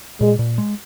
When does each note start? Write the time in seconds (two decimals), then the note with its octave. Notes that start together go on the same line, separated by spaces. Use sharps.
0.21 A#2 G#3
0.39 A#2
0.58 G#3